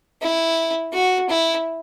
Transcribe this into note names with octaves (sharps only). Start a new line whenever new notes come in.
E4
F#4
E4